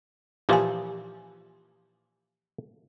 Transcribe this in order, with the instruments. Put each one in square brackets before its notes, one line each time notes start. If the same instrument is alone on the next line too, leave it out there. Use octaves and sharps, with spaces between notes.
[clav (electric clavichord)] A#2 E3 F3 [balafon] G4 F5 G#5